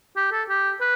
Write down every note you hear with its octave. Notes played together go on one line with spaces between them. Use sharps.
G4
A4
G4
B4